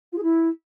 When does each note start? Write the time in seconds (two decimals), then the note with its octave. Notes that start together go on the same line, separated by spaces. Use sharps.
0.12 F4
0.17 G#4
0.22 E4